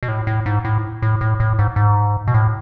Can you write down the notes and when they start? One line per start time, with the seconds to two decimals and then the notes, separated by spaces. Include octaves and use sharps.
0.03 B2
0.08 A2
0.27 A2
0.46 G#2
0.65 A2
1.02 A2
1.21 A2
1.40 A2
1.59 G#2
1.76 G#2
2.28 B2
2.34 A2